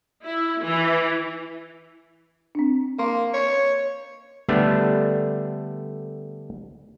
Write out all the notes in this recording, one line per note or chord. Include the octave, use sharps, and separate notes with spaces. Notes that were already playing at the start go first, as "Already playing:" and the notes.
E4
E3
C4 D4
A#3 F5 C6
C#5
D3 G3 A3 B3 D4